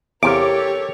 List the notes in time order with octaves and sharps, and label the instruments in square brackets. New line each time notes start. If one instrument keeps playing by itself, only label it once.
[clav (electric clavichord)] E2 C3 F5 [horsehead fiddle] G4 A4 [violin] A#4 C#5 [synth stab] D6